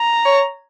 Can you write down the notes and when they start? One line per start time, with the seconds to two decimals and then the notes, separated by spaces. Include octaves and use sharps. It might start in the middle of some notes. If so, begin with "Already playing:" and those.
Already playing: A#5
0.25 C#5